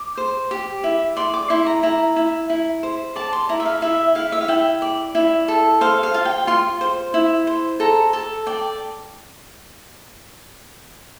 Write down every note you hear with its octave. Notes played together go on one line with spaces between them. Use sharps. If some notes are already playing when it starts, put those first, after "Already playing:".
Already playing: D6
C5
G4
E4
D5 C6
D6
E4 C6
A#5
E4 A#5
E4
E4
C5
D5 A5
C6
E4 A#5
E5
F5
E4 E5
E4 F5
E5
F5
E4 G5
D5
E4
A4
C5 F5
F5
F4
G5
F4 C6
C5
E4
C5
A4 A#5
A4 A5
D5 G5